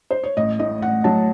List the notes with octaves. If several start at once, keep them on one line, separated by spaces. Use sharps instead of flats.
C5
C#5
A1 D#5
A2 D#5
A1 F#5
F#3 A5